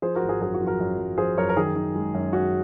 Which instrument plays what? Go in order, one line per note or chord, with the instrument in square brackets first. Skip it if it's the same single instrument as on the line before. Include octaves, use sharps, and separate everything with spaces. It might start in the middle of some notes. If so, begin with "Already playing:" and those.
[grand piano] F3 G#4 C5
F#4 A#4
G#1
G#4
F#2 G#4
F#4
F3
F#4 A#4
F#2
F#2
F3 G#4 C5
F#2 A#4 C#5
A#4
D#3 G#4
D#3
G#3
F#2
C#4 F#4